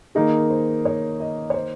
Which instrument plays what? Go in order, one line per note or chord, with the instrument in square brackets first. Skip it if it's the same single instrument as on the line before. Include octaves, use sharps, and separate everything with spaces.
[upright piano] D#3 A#3 D#4 [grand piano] G#4
[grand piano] C5
C#5
D#5
C#5
C5